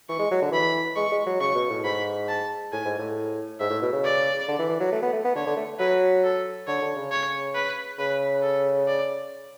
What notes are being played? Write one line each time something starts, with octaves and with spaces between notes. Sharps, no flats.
E3 C#6
G#3
F#3
D3
E3 B5
G#3 C#6
G#3
F#3
C#3 C#6
B2
A2
G#2 B5
A5
A2 G#5
G#2
A2
G#2 E5
A2
B2
C#3
D5
D3
E3
E3
F#3
A3
B3
A3
B3
D3 C#5
D3
A3
F#3 B4
A4
D3 C#5
D3
C#3
C#5
B4
C#3 B4
A4
D5